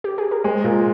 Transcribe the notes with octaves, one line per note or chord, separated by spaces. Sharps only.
G4
G#4
A#4
G#3 C5
A#2 A#4